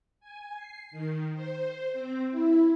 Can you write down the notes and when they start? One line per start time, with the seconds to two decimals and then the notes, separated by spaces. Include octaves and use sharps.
0.20 G#5
0.56 C7
0.91 D#3
1.33 C5
1.93 C4
2.31 E4